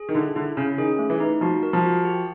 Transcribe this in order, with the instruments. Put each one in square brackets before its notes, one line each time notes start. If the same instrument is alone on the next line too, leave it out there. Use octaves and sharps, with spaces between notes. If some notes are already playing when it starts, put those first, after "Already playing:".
Already playing: [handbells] G#4
[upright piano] D#3
[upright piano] D3 [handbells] E4
[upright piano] D3 [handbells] E4
[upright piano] C#3 [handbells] C#4
[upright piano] D#3 [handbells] G#4
[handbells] A3
[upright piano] E3
[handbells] D#4
[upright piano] F3 [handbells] F#4
[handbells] A#4
[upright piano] F3
[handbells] F#4
G4